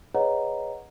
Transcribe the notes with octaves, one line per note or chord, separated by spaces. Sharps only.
G#4 B4 C#5 D#5 F#5 A#5